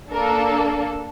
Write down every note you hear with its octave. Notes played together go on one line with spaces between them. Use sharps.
A#3 D4 A4 A#4